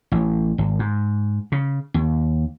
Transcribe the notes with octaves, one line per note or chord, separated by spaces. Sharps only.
A1
G#1
G#2
C#3
D#2